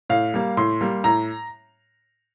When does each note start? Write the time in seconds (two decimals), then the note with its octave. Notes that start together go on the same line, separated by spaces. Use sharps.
0.10 A2 F5
0.34 G3 A#3
0.57 A2 C6
0.81 G3 A#3
1.04 A2 A#5